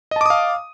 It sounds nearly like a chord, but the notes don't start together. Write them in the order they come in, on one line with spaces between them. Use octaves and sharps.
D#5 A5 D6 D#6 F5